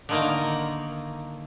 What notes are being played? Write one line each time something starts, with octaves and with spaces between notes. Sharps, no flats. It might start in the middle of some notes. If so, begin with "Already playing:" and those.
D3 D#3 A#3